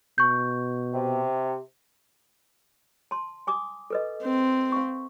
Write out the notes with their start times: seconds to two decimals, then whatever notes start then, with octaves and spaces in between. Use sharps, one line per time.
0.18 B2 C#6 G6
0.93 C3
3.11 A5 C6
3.47 G#5 D6 D#6
3.90 A4 B4 D#5
4.23 C4
4.72 F5 C#6